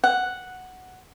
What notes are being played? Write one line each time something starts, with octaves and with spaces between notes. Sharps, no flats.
F#5